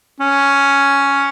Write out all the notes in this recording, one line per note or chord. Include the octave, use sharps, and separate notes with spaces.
C#4